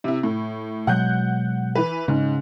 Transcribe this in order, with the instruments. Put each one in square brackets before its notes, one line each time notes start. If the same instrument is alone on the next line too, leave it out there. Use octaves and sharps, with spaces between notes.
[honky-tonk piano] C3 E4
A2
[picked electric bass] B2 F#3 G#3 [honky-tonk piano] F#5 F#6 G6
[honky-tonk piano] E3 B4
[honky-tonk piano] G#2 [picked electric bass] C#3 C#4